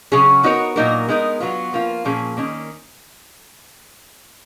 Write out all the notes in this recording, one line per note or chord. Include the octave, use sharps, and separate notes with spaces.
C#3 F#3 C#4 G#4 C#5
B3 D#4 F#4 A#4 C#5
A#2 F#3 A#3 D#4 A#4
G#3 B3 D#4 A#4
F#3 B3 F4
F3 A#3 F4
A#2 F3 A#3 C#4 G#4
D#3 A#3 C#4